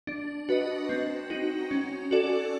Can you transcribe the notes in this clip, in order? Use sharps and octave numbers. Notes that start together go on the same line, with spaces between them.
D4
F#4 B4 D#5
C4
D#4 F#4
C#4
F#4 A4 D5